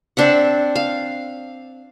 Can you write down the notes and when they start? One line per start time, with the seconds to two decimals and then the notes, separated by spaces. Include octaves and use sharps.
0.17 C4 D4 E5 F#5
0.76 F5